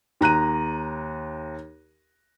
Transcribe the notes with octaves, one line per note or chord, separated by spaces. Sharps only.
D#2 A#5 F#6 D#7